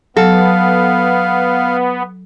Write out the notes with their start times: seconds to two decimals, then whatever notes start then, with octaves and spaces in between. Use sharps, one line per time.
0.17 F#3 B3 A4 F5